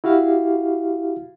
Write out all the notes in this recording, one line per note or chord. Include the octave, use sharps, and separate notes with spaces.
E4 F#4 G4 F5